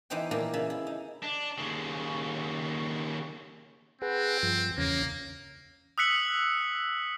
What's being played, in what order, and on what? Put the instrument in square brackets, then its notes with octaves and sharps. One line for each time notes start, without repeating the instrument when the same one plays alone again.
[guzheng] E3 B3 D#4 G4 C5 G5
A#2 E3 A#3 D#4 G4
C#3 E5 B5
E4
D#4
[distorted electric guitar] D4
D#2 C#3
[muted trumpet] C4 [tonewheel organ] G#4 B4 F#5
[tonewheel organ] G2 F3
[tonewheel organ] E2 C#3 C#4 [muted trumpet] A#3
[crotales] D#6 E6 F#6 B6 C#7 F#7